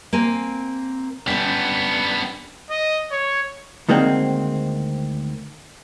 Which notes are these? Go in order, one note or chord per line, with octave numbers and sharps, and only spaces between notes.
A#3 C4 G#5
G3 B3 C#4 D4
D#5
C#5
D2 D#3 G#3 A#3 C4